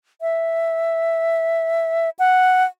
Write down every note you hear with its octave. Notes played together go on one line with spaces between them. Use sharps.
E5
F#5